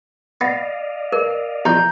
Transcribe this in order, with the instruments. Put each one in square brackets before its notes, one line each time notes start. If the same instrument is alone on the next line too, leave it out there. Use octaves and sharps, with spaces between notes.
[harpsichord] B3 [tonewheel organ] D5 D#5 F5
[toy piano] A#4
[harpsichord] E2 F3 [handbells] A#5 G6